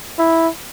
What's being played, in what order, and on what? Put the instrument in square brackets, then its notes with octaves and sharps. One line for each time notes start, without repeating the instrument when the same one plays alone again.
[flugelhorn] E4